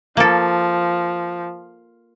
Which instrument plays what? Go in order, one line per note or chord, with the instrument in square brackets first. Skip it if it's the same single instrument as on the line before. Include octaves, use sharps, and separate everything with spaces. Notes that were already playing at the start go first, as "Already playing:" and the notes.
[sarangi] F3 [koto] A#3 A4